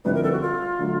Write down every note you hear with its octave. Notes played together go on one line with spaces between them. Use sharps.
F2 D3 G3 C4 E4 B4
A#4
A4
F#4
F4
D3 F#3 A3